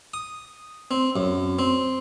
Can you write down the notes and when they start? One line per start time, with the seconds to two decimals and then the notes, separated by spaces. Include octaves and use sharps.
0.14 D#6
0.91 C4
1.16 F#2
1.59 C4